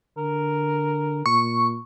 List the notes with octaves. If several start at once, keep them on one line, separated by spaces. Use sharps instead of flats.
D3 A#4
A#2 C#6